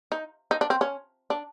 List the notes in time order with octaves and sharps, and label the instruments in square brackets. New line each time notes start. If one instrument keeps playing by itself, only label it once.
[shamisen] D#4
D#4
D4
C4
C#4
D4